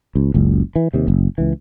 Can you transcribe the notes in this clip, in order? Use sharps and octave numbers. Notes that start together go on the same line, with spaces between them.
C#2
F#1 C#2
E3
D#2 C3
F#1
C#2 E3